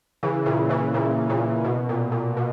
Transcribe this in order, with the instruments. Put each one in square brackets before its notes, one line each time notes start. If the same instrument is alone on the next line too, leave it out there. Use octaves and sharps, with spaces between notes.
[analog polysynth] C#3 E3
A#2 C#3
C#3 E3
A#2 C#3
A#2 C#3
B2
A#2
A#2
B2